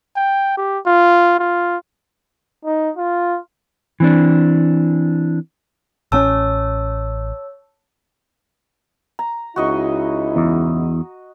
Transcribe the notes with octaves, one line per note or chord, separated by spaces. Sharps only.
G5
G4
F4
F4
D#4
F4
E3 C4 D4
A1 C4 C#4 C#5 A5 E6
A#5
C#2 D#4 E4 F#4 D#5 C#6
E2